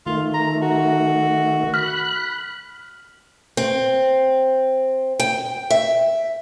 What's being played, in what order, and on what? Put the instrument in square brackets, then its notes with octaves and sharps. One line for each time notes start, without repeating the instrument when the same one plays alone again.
[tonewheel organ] D#3 A3 [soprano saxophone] F4
[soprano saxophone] A#5
F#4
[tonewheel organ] B5 F#6 [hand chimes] F6
[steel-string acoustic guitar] C4
G5
E5